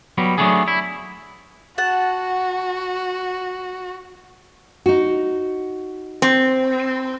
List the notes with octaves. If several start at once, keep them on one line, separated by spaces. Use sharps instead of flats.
F#3 G3 B3
F#3 G3 A3 B3 D4 G#4
E4
F#4 F#5 A5
D#4 F#4
C4